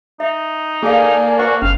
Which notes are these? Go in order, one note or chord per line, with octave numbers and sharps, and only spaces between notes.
D#4 E5
A#3 G#4 A4 D5 F5 G#5 A5
F#4 B4 C5 F#5
G1 C#4 F5